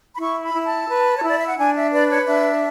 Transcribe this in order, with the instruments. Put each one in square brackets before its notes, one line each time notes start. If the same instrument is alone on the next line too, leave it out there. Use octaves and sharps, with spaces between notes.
[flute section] B5
E4 C#6
B5
E4
A5
B4
C#5
E4
D5
E5
F#5
D4 G#5
E5
B4 D5
C#5
D4 E5